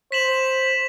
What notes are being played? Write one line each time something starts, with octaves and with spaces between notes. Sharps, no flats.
C5 B6 E7 F#7